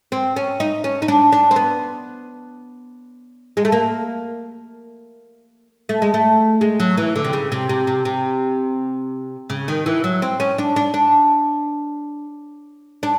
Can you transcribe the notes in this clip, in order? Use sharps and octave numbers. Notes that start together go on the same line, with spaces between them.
C4
C#4
D#4
C#4
D#4
D4
D4
C4
B3
G#3
A3
A#3
A3
G#3
A3
G#3
F#3
E3
D3
C3
C#3
C3
C3
C3
C3
C#3
D#3
E3
F#3
C4
C#4
D4
D4
D4
D4